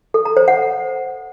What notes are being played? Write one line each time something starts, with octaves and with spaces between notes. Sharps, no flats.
A4
A#5
C5
F#5